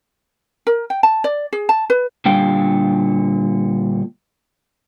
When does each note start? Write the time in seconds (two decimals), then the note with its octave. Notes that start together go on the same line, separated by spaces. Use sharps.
0.67 A#4
0.90 G5
1.03 A5
1.24 D5
1.53 G#4
1.69 A5
1.90 B4
2.25 A#2 D3 G3 F5 G5